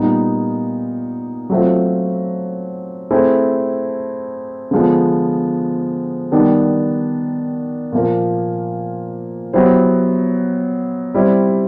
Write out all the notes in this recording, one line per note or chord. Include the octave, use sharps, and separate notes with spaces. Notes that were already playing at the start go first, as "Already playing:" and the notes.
Already playing: A#2 G3 B3 D#4
F#3 A3 C4 F4
A3 C4 E4 G#4
D3 F3 G#3 B3
D#3 G3 B3 D4 G4
A#2 F3 A#3
F#3 B3 E4 G4 C5
G3 C4 E4